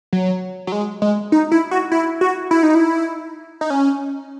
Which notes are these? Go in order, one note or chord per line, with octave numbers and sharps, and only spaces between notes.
F#3
F#3
G#3
G#3
D#4
E4
F#4
E4
F#4
E4
D#4
E4
D#4
C#4